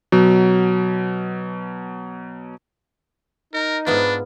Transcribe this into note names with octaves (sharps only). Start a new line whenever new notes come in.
B2 F#3
D#4 A#4
G#2 B3 D4 F4 B4